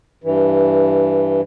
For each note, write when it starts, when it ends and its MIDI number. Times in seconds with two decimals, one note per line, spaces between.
0.24 1.41 43
0.24 1.41 52